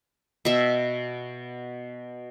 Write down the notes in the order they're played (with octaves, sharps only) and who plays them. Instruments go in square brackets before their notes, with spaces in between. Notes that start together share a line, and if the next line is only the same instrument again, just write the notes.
[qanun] B2 E5